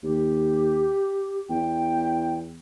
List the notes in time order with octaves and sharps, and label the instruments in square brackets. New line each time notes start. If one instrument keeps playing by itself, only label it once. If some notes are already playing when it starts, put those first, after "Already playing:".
[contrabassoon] D#2 [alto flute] G4
[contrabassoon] E2 [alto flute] G5